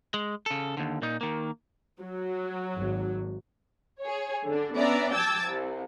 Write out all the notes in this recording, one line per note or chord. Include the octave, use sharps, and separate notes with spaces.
G#3
C#3 A4
D#2 D3
A#2 D#4
D#3 A#3
F#3
G#1
G#4 C#5
D3 D4
B3 C#4 D4 D5 E5 A#5
G5 A5 D6 E6 G#6 A6
C2